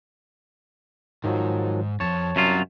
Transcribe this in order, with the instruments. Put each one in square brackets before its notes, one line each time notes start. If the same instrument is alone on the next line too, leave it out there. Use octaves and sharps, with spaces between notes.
[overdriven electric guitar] G#2 [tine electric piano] D#3 F3 F#3
[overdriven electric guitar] F2 F3 [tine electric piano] C#5 A5
[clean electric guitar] F#2 F#3 F4 [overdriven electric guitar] C3 G3